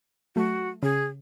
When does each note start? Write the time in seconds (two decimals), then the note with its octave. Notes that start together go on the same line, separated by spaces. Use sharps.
0.36 F#3 A3 F#4
0.83 C#3 G#4